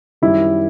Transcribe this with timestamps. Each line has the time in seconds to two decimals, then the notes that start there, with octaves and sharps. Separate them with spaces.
0.22 F#2 D#3 G3 E4